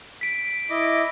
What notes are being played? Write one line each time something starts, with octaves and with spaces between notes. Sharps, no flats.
B6 D7
E4 D#5 D6